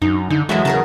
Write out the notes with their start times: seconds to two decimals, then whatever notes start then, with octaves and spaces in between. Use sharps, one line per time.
0.02 F#2 D#4
0.30 D3 D#4
0.49 E2 F#3 G#3 F#4 A4 E5
0.65 C#3 G#4 A#4 A5